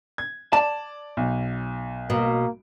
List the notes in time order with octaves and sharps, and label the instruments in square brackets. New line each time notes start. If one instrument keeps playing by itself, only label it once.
[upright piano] G#6
[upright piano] D5 [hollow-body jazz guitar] A5
[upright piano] B1
[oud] B2 [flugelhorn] A#3